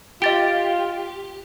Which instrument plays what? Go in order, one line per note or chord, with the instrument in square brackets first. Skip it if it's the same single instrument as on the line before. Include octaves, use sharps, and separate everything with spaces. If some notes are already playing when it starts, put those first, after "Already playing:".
[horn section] F4 [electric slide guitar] G4 [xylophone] D#5 A6 D7